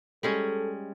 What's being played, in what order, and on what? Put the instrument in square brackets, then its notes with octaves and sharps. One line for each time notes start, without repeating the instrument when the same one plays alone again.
[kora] G3 G#3 C#4 [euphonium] A4